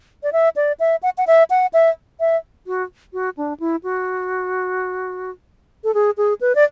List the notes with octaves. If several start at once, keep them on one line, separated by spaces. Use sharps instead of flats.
D5
E5
D5
E5
F#5
F#5
E5
F#5
E5
E5
F#4
F#4
D4
E4
F#4
A4
G#4
G#4
B4
D5